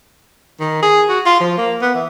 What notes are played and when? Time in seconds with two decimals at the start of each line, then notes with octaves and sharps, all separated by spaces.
0.60 D#3
0.82 G#4
1.09 F#4
1.26 F4
1.40 F3
1.58 A#3
1.81 B3
1.94 E3